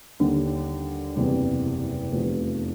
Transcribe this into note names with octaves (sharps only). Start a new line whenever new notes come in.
D#2 D3 G3
F#1 E2 C3 E3 G3
F1 E2 C3 F3